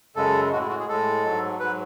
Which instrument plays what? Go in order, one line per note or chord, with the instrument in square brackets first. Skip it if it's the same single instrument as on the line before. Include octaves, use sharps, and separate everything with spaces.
[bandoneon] F#2 C#3 G#3 A4
A2 G#3 F#4
E4
F#4
G#4
A2 G#3 A4
G#2 F#3
G#2 F#3 B4